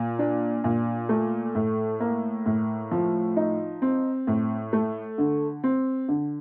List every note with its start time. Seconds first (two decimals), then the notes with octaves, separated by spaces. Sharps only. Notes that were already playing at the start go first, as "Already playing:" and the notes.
Already playing: A#2
0.19 D4
0.64 A#2
1.09 A3
1.55 A2
2.00 A#3
2.46 A2
2.91 F3
3.37 D#4
3.82 C4
4.27 A2
4.73 A3
5.18 D3
5.64 C4
6.08 D3